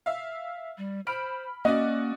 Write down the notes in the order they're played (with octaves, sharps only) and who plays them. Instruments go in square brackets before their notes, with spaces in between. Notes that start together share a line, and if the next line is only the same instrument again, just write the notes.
[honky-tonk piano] E5 F5
[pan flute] G3
[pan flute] C5 [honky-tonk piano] B5 F6 D7
[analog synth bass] A#3 [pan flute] C#4 [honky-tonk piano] F#4 D5 [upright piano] D#5